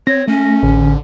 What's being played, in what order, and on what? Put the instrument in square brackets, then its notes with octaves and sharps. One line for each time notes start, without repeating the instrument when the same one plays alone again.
[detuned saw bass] C4 [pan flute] C#5 [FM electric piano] A#6
[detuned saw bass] A3 [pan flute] C#4
[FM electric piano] A1 [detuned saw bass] D3